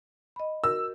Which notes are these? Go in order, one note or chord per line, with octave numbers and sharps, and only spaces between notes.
D#5 B5
F#4 A#4 E6